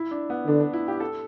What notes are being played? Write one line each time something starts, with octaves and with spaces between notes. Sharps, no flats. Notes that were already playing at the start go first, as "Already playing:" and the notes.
Already playing: E4
D4
B3
D3 D4
D4
E4
G4
A4